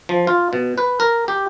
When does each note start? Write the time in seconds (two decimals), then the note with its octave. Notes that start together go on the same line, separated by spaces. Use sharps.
0.09 F3
0.27 F4
0.53 B2
0.78 B4
1.00 A#4
1.28 G4